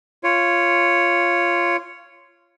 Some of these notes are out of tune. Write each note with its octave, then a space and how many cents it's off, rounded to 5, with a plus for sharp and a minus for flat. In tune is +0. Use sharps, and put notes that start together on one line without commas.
F4 -10 C#5 +0